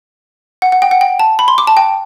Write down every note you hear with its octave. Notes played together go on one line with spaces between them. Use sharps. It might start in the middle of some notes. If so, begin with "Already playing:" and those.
F#5
F#5
G5
F#5
G5
A5
B5
C6
D6
A5
G5